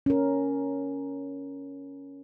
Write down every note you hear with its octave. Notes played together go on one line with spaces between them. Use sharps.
C#4 A#4